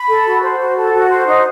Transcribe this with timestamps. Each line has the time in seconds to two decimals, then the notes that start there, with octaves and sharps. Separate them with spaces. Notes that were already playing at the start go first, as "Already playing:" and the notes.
Already playing: B5
0.09 A4
0.26 F#4
0.43 C5
0.59 F#4
0.76 A4
0.93 F#4
1.10 C5
1.27 D#4